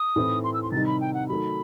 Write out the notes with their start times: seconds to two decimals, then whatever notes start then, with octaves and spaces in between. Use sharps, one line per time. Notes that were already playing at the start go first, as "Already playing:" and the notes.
Already playing: D#6
0.16 A2 E3 A3 C4 E4
0.44 C6
0.54 E6
0.63 C6
0.72 C3 D#3 G3 D#4 A6
0.86 B5
1.01 G5
1.14 F#5
1.28 D#3 F#3 A3 B5